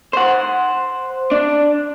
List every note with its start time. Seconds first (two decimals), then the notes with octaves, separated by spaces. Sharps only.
0.13 C5 F#5
1.31 D4